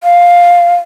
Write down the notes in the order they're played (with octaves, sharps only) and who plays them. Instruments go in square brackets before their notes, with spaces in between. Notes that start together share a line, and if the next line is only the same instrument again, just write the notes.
[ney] F5